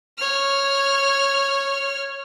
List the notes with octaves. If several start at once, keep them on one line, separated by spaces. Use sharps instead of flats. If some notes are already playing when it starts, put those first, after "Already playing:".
C#5 F6